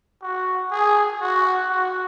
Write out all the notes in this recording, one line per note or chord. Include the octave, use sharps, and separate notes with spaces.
F#4
G#4
F#4
F#4